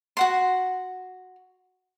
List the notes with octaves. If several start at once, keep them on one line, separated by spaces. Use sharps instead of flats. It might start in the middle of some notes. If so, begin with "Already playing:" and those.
F#4 F#5 C6